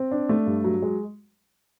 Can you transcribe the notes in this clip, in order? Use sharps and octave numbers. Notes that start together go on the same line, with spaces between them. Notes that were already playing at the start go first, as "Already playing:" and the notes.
Already playing: C4
D4
A3
G2
F#3
G#3